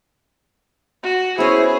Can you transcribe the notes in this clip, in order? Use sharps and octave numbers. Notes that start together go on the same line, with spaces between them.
F#4
B3 C#4 E4 G#4 C5